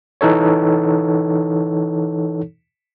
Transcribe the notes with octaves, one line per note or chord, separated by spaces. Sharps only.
E3 D#4 A4 C#5